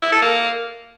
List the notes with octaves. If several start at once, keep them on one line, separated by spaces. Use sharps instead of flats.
E4
A4
A#3